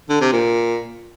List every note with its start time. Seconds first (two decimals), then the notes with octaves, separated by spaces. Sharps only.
0.10 D3
0.21 C3
0.32 A#2